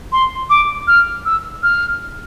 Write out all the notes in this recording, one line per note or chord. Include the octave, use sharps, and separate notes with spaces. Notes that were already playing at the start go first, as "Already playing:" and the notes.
C6
D6
F6
E6
F6